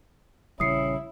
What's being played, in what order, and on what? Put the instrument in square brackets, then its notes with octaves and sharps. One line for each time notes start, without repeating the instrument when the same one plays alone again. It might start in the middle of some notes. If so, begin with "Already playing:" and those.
[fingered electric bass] A#1 C#3 G3 [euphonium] C#4 [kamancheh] E4 [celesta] D#6 C7 C#7